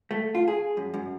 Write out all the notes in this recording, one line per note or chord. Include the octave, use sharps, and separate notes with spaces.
A3
F4
G#4
F#2
F#2